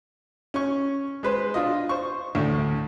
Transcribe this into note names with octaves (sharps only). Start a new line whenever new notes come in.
C#4 C#6
G#3 B4 C5
D4 F4 D#5
C5 C#6
D2 A2